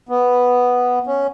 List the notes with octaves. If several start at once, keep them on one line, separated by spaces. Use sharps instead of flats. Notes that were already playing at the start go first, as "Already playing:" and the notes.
B3
C#4